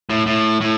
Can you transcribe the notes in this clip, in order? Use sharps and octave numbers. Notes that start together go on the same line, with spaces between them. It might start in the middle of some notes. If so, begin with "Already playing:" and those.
A2
A2
A2